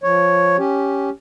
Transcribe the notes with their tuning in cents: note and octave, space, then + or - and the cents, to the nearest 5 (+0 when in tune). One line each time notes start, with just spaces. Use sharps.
F3 +0 C#5 +0
C#4 +5 G4 +0